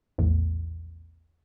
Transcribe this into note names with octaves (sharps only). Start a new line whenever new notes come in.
A#1 E2 A2